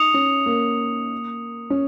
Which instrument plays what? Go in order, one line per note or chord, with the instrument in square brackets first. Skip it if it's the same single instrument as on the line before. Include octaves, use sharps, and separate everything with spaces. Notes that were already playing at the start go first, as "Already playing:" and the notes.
Already playing: [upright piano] D#4 [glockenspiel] D#6 C#7 F7
[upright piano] C#4
A#3
C#4